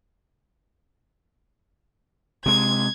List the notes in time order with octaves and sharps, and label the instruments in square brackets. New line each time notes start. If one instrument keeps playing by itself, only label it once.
[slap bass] C3 G#3 [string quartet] G#6